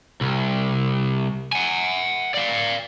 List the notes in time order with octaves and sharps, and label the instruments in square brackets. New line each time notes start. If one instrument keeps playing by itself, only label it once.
[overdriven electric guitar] C2
F#5 G#5
D5 F5